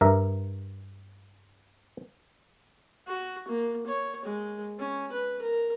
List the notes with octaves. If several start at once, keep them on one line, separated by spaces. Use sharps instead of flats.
G2 A#4 E5 A#5
F#4
A#3
C#5
G#3
C#4
B4
A#4